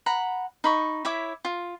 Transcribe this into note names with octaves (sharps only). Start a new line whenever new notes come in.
F#5 A#5 B5
D#4 B5 C#6
E4 C#5 E5 D6
F4